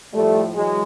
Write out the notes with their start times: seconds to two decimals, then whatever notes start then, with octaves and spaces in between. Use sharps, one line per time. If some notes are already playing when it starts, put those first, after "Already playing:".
0.13 A2 F3 G3 A3
0.54 E3 F#3 G#3